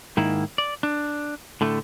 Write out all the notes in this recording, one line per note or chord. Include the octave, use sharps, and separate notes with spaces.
G#2 D#3 A#3 E4
D5
D4
A2 D3 A3